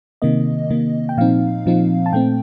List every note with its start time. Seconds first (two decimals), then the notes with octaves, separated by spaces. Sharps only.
0.22 C3 D#3 A#3 D#5
0.70 C3 D#3 A#3
1.09 G5
1.17 A#2 F3 C4 D#4 F5
1.66 A#2 F3 C4 D#4
2.06 A5
2.13 A#2 A3 C4 G5